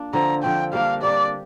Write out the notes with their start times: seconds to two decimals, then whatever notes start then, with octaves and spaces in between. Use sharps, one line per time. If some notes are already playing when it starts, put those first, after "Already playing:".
Already playing: A#3 D4 F4
0.13 D3 F3 C4 A#5
0.43 D3 F3 C4 G5
0.73 G3 A#3 D4 F5
1.02 G3 A#3 D4 D5